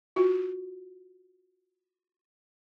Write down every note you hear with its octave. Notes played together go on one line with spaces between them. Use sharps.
F4 F#4